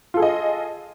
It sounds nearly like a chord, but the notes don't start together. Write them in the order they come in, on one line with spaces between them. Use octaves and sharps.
F4 A4 G#4 D#5